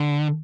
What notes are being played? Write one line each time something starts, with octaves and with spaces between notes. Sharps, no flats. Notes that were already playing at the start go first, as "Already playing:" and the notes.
Already playing: D3